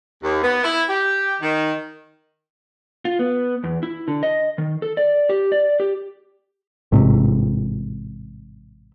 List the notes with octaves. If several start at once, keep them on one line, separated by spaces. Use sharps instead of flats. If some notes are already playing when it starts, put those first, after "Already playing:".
D#2
B3
E4
G4
D#3
F4
B3
E2
E4
D3
D#5
D#3
A4
D5
G4
D5
G4
A1 G#2 C3